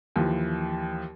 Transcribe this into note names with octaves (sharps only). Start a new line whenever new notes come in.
D#2 E3 F3